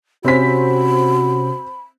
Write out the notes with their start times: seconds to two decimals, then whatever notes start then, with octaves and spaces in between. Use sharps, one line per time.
0.25 C3 C4 C#4 F#4 B5 B6